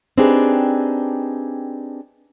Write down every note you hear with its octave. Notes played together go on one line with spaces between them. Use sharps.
C4 D4 D#4 G4 G#4 B4